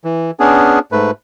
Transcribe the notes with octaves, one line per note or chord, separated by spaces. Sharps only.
E3
B3 C#4 D4 G#4
G#2 A3 B4